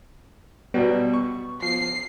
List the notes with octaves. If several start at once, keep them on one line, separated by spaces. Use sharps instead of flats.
B2 F#3 G3 B3
C#6
F3 C7